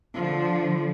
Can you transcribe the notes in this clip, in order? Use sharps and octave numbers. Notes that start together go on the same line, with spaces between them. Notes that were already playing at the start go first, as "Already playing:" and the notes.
D3 F3